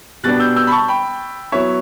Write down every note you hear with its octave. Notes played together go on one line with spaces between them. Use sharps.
B2 G3 B3 D4 F#6 A6
E6 G6
E6 G6
B5
A5 C#6
G5 B5
F#3 B3 E4 C#5 E5